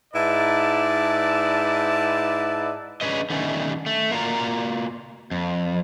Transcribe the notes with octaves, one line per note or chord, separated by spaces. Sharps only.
G#2 D#4 E4 B4 D5 A5
C#4 D4 G#4 B4 D#5
D3 D#3 G3 A3 C#4
A3
A#3 F4 F#4 D5 A#5
F2